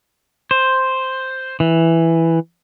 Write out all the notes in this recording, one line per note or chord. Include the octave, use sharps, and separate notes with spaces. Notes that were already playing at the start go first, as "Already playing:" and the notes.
C5
E3